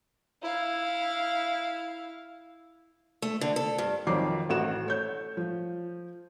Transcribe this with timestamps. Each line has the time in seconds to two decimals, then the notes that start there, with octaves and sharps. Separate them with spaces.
0.42 E4 F5
3.22 A3
3.41 D3
3.56 A4
3.78 G2
4.07 F2 D#3 F#3 D6 C7
4.49 A1 F#4 E7
4.86 A3 C#5 G6
5.37 F3